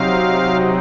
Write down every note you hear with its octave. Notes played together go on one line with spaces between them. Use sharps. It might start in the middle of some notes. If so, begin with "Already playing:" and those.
Already playing: C3 F#3 C4 D#4 F5